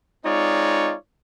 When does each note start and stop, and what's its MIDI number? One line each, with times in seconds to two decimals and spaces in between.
0.24 0.94 56
0.24 0.94 60
0.24 0.94 63
0.24 0.94 65
0.24 0.94 73
0.24 0.94 74